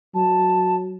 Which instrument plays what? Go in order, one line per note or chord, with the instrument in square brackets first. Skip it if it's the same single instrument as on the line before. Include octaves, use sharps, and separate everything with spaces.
[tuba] F#3 [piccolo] A5